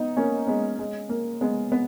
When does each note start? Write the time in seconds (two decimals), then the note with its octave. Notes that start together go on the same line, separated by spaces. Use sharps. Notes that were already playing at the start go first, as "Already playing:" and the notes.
Already playing: B3 D#4
0.17 A#3 C#4
0.47 G#3 B3
0.79 G#3
1.09 A#3
1.41 G#3 B3
1.72 B3